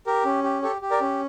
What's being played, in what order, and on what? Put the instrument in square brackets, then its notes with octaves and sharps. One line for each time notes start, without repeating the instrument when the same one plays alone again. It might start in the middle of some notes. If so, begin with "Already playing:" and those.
[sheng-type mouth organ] G4 A#4
C#4
G4
G4 A4 C#5
G4
A#4 D5
C#4